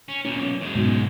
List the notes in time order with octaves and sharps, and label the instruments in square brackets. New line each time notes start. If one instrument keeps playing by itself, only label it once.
[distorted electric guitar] C#4
[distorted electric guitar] B1 A#2 [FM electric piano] C#4
[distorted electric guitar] F#2 G#3
[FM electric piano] G#2 B2